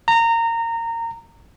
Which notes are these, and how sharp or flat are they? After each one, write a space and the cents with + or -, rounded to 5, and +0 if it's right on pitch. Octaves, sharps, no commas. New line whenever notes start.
A#5 -20